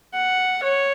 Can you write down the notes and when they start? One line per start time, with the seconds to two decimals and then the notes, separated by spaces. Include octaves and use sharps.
0.13 F#5
0.63 C#5